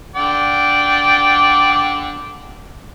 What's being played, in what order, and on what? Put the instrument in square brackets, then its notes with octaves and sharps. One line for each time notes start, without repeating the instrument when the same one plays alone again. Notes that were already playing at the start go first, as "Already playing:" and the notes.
[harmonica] D3 D5 G5